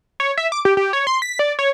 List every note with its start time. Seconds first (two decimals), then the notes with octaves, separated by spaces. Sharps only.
0.20 C#5
0.38 E5
0.52 D6
0.65 G4
0.77 G4
0.93 C#5
1.07 C6
1.22 B6
1.39 D5
1.59 C#5